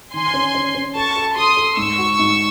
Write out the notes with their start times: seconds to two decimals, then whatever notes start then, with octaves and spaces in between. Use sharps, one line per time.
0.13 D#3 G#5 C6
0.34 C#4
0.55 C#4
0.75 C#4
0.95 A4 A5 C#6
1.16 A4
1.36 A4 C6 D#6
1.57 A4
1.77 G#2 C#6 E6
1.98 F#4
2.19 G#2